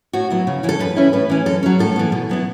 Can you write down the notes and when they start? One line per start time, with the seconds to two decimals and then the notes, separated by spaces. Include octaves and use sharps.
0.13 A2 F#4
0.30 F#3 B3 E4
0.47 C#3
0.63 E3 C#4 E4
0.69 A4
0.79 F#2 B4
0.96 E3 C#4 E4
1.13 A2 B4
1.30 E3 C#4
1.46 F#2 A4
1.63 F#3 C#4
1.79 A2 A4
1.96 E3 B3
2.12 B2
2.29 F#3 B3 E4